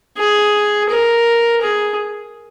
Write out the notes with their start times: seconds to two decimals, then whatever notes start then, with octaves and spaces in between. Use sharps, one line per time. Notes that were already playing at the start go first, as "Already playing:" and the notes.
0.17 G#4
0.89 A#4
1.62 G#4